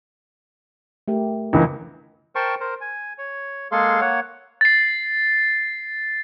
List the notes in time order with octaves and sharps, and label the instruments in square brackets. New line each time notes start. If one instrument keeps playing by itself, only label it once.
[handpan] A3 G4 A#4
[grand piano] C#2 E3 A#4
[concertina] A#4 C5 G5 A5 C6 C#6
A#4 C5
G#5
C#5
G#3 A#3 G#4 A4 F5 C6
A#3 C#5 F#5
[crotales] A6 C7